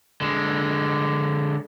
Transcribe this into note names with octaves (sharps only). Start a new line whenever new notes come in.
D3 G#3